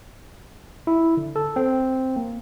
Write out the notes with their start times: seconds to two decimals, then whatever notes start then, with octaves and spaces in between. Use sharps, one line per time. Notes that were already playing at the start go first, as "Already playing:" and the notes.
0.87 E4
1.17 D3
1.36 A4
1.56 C4
2.16 A#3